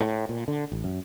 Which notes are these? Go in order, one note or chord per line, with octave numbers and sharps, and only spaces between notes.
A2
A#2
D3
A1
F#2